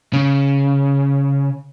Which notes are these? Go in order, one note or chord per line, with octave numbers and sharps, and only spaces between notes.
C#3